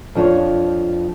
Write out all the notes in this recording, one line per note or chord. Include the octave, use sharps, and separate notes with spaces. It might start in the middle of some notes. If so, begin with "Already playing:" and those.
F2 F3 D4 F4 C#5